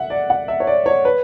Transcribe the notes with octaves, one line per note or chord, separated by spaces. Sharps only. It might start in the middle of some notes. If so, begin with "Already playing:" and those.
Already playing: E5 F#5
D5
F#5
E5
C#5
D5
C#5
B4